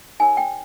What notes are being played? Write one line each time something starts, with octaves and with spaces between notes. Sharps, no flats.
D#4 G4 A#4 C#5 G#5
G5